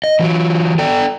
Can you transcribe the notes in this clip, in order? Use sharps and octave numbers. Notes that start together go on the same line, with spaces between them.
D#5
E3 F#3
A4 D5 G5